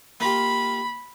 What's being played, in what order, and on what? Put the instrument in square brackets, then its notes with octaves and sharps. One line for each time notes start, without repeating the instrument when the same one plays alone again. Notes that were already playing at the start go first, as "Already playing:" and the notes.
[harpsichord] A#3 F4 G4 [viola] B5